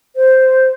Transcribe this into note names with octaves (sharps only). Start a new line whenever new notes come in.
C5